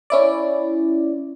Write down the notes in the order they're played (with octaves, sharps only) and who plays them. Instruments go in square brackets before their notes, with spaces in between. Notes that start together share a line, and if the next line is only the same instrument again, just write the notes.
[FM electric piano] C#4 E4 D5